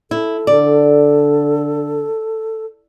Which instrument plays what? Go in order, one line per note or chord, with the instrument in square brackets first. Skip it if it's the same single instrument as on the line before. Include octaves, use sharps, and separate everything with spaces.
[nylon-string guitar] E4 [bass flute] A4
[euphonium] D3 [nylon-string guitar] D5